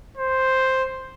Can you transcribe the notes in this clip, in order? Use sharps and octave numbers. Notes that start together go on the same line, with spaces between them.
C5